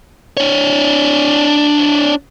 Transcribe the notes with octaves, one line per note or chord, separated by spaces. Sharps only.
D4 C#5